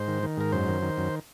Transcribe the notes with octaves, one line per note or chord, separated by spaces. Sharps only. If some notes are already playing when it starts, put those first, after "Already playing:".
Already playing: G#2 C5
D#3
D#3
G#2 A#4
F#2 C5
D#3
D#3
F#2